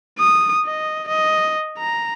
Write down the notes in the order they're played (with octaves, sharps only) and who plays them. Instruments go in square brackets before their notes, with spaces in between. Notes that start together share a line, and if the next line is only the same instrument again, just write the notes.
[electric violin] D#6
D#5
D#5
A#5